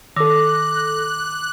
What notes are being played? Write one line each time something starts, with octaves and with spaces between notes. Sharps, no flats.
D#3 A4 D6 F#6 A#6